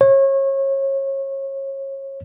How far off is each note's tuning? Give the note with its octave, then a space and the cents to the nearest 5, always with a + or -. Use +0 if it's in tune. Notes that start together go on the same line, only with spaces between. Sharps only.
C#5 -30